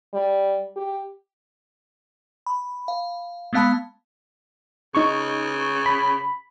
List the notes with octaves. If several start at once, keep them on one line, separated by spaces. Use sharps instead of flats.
G3
G4
B5
F5
G#3 A3 B3 F5 A5 B5
C#3 D#4 C#6
B5